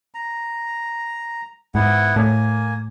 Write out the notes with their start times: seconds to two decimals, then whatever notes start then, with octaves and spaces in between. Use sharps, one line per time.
0.14 A#5
1.75 G#2 B3 E4 F#5
2.16 A2 A#3 G#5